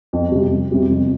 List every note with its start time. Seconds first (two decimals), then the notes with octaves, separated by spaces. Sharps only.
0.13 F2
0.32 C3 G3
0.52 F2
0.71 C3 G3
0.91 F2